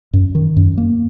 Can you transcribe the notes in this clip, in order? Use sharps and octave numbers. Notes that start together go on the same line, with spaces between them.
F#2
D#3
F#2
A#3